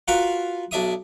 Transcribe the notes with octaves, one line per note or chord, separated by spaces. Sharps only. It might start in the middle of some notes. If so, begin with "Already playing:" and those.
F4 F#4 A#4 B4 F5
B1 D4 E5 D#6